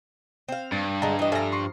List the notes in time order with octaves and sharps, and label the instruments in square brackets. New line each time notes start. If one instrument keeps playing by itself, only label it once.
[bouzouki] C4 F5
[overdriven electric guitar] G2 [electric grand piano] A6
[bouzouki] D3 G#3 [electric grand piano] A5 A#5
[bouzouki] E3 D#5
[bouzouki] F3 A#5 [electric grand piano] A4 E5 G#5
[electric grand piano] C6 C#6 C7